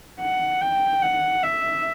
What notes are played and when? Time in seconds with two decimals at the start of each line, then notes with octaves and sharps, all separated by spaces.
0.20 F#5
0.61 G5
1.02 F#5
1.43 E5